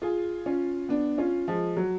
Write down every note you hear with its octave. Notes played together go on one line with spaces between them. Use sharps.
F4 G#4
C#4 F4
B3 D4
C#4 F4
F3 G#3
F#3